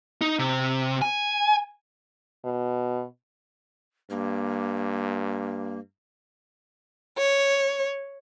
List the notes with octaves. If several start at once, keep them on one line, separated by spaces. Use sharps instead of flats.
D#4
C3
G#5
B2
G2 A#3
C#5